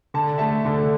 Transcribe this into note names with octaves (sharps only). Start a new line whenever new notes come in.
D3 A5
A3 E5 A5
D3